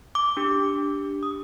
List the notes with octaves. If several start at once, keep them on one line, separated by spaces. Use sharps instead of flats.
D6
D4 G4
D#6